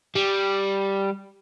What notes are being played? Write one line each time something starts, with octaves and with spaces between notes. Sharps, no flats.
G3